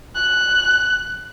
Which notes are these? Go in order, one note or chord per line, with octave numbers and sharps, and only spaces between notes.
F#6